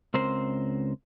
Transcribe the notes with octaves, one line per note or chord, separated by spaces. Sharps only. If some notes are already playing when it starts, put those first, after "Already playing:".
C#2 C4 A#4 C5